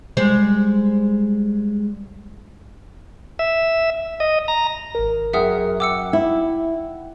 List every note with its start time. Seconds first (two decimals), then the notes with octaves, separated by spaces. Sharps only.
0.17 G3 G#3 C5
3.39 E5
4.20 D#5
4.48 A#5
4.95 G#1 A#4
5.33 F#2 G#4 A#4 E5 F#5 G5 D#6
5.80 F#5 G5 D6 E6 C#7
6.13 E4